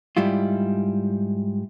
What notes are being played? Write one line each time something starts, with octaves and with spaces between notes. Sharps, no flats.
G#2 G3 E4 F4